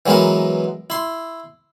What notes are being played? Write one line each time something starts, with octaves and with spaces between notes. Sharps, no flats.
E3 F#3 G#3 B3 A#4
E4 C6